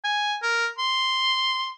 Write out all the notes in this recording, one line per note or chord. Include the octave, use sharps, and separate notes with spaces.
G#5
A#4
C6